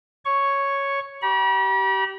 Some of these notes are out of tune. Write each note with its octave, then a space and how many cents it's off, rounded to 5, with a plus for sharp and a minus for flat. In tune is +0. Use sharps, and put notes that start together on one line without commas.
C#5 +0 C#6 +0
G4 -25 B5 -45